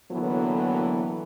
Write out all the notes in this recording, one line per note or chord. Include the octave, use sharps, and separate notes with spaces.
A2 D3 E3 F#3 A#3 B3